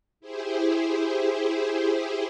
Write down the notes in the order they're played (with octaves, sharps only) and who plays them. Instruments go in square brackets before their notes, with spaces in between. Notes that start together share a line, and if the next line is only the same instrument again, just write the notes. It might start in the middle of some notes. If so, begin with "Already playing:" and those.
[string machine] E4 G4 G#4 C5